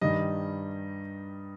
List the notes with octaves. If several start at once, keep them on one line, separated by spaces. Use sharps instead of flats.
G2 D#3 G3 D#5